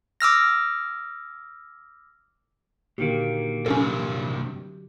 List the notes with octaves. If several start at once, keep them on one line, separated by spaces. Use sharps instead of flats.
D6 E6 F6 A#6
A#2 D3 D#3 A#3 F#4 G4
G2 C3 F#3 C#4 F#4 A4